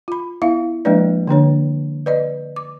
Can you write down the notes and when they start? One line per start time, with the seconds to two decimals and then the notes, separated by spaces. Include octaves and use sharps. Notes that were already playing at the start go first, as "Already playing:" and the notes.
0.08 F4 B5
0.42 B3 E4 E5 F5
0.85 F3 G#3 A#3 D4 B4 D5
1.28 D3 A#3 D4 C#5
2.06 B4 D5 D#5
2.56 D6